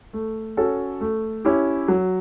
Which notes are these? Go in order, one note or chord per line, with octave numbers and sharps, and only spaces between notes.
A3
C#4 F#4 A4
A3
C#4 E4 G4
F#3